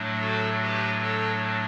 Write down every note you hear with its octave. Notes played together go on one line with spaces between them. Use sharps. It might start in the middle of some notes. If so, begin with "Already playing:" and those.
Already playing: A2 F#3 A3 D4
F#4 A4
G4 B4
A4 C#5